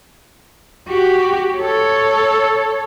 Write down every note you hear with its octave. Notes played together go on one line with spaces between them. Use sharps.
F#4 G4
A4 C#5